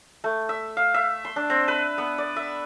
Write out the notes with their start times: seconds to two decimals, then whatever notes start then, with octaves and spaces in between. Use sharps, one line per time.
0.24 A3
0.49 E5
0.77 F5
0.94 E5
1.25 C6
1.36 D4
1.50 C4
1.68 B4
1.98 B3
2.18 D5
2.36 E5